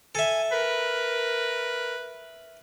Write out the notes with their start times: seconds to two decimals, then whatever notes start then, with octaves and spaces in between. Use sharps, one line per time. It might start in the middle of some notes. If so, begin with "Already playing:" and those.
0.15 A4 E5 G#5
0.52 A#4 B4